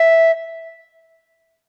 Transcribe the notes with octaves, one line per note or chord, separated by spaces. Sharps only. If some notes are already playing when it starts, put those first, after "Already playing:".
Already playing: E5